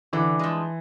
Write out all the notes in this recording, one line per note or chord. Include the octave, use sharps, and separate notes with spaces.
D3 E3
F3 G#3